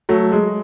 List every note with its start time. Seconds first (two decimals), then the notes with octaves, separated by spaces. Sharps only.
0.09 F#3 A3
0.32 G#3